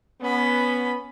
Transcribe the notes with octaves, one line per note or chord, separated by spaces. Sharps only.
B3 C#4 B5